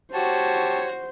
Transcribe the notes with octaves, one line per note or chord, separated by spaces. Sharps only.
F#4 G4 C5 C#5 A5